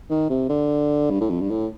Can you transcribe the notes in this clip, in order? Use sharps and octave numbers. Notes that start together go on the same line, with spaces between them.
D#3
C3
D3
G2
A2
F2
G2
A2